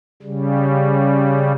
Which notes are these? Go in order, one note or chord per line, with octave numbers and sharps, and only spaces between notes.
C#3 G3